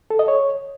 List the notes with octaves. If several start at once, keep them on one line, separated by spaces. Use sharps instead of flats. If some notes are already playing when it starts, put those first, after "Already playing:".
A4
D#5
C#5